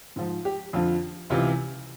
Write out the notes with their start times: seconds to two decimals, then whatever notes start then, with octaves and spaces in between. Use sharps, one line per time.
0.16 G#2 F3
0.45 G4
0.73 F2 D3 F3 F4
1.30 C#2 C3 E3 F4